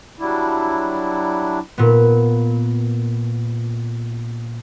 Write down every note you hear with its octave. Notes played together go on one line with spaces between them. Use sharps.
F#3 G3 D4 E4
A#2 B3